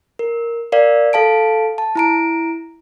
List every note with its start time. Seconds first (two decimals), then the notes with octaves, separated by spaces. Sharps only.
0.19 A#4
0.72 A#4 D5 F5
1.13 A4 F5 A5 D7
1.78 A5
1.95 E4 A#5 D7